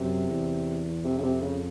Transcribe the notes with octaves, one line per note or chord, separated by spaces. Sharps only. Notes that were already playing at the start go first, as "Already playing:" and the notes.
Already playing: F#2 C3
E2
F2 C3
C#3
C3
C#3